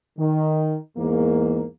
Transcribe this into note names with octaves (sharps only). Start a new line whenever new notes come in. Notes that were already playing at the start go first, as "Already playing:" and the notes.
D#3
E2 G#2 A#3